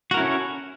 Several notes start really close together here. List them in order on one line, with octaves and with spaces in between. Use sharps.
F#4 A#4 E4 C#4 A4